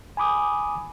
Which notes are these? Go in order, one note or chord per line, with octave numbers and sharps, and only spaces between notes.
G#5 B5 D6 D#6